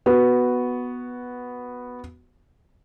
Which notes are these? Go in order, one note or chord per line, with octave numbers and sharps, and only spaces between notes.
B3 F#4